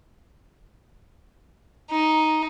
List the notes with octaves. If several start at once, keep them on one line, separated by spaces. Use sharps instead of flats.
D#4